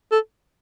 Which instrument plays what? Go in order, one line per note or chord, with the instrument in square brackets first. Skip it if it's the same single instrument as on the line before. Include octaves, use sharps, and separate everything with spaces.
[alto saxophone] A4